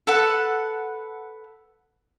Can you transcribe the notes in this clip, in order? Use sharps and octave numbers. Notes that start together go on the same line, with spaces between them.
A4 B4 F#5